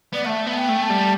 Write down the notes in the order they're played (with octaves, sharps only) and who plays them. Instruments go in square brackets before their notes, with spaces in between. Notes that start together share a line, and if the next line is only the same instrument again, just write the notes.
[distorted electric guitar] B3 [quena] D5
[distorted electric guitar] A3 [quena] E5 F#5
[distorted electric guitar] B3
[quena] A5
G5
[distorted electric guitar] A3
[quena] A5
[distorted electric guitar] G3